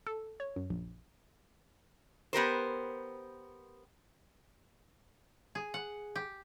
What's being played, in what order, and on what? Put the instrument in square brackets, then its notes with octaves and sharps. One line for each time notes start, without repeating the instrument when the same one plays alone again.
[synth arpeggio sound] A4
C#5
F#2
A#1
[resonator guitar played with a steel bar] B3 G4 A#4 C5
[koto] G#4
F#5
G4